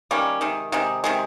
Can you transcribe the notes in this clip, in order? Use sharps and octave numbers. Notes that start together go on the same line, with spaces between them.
D#3 G3 A#3 C#4
C3 D#3 G#3
C3 D#3 G#3
C3 D#3 G#3